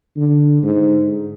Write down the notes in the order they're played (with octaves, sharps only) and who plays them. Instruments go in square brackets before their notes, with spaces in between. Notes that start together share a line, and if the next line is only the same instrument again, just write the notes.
[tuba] D3
G#2